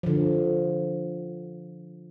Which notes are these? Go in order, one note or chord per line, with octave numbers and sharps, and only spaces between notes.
D3 F3